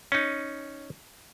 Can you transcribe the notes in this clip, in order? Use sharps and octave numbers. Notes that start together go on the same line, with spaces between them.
C#4 D#4